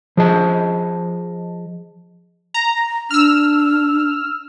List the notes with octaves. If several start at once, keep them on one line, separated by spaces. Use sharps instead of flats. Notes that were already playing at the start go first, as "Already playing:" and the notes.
F3 G#4 D#5 A5
A#5
D4 E6 F6